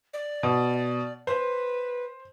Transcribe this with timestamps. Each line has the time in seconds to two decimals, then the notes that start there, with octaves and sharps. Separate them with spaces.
0.13 D5
0.43 B2
1.27 B4 C5